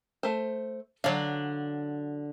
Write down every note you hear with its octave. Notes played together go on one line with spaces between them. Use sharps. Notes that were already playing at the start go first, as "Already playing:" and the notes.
A3 C5
D3 F#3 D4 C#5 F5